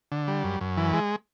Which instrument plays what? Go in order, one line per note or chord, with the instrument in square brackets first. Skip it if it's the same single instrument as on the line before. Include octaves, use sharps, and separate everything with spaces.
[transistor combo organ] D3
G3
F#2
F#2
E3
G#3